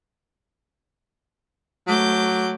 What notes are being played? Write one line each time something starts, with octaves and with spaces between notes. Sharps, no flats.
F#3 A3 D6 G6